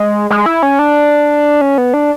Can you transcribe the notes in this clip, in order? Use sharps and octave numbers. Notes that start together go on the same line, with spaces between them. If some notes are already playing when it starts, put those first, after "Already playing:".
Already playing: G#3
G#3
E4
C#4
D4
C#4
B3
D4